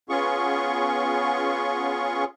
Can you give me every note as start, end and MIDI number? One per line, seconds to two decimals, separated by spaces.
0.09 2.24 59
0.09 2.24 61
0.09 2.24 65
0.09 2.24 68
0.09 2.24 85